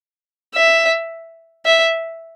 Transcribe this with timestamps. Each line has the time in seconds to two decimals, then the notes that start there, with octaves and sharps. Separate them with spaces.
0.55 E5
1.65 E5